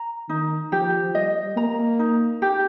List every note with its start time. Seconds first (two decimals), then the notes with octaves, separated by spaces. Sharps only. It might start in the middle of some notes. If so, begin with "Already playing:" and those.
Already playing: A#5
0.29 D#3 D#4
0.72 F3 G4
1.15 G3 D#5
1.56 A#3 A#5
1.99 D#4
2.42 G4